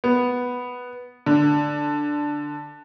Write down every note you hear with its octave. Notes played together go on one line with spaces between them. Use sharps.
B3
D3